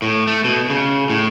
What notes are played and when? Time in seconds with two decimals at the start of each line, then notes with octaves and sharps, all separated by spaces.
0.02 A2
0.27 A3
0.44 B2
0.70 C#3
1.10 A2